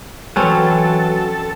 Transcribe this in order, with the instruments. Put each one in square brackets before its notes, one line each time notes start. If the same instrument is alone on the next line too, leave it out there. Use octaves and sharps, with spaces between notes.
[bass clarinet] E3 [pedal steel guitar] F#3 [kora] C4 C#4 B4 [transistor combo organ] A4